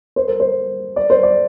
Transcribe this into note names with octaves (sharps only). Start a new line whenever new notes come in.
C5
A#4
C5
D5
C5
D5